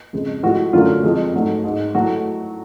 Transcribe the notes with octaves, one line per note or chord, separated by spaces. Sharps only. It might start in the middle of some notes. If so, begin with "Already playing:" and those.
F2 C#3 G#3
A2 F3 G#3 F#4
F#2 D3 F#3 A3 F4
F2 F3 G#3
G#2 F#3 A3
G#2 G#3
A2 F#3 A3 F#4